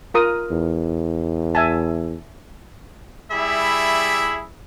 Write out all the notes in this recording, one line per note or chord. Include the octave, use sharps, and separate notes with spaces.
F4 A#4 D#6
E2
E5 G#5 A5
G3 E4 G#4 E5 B5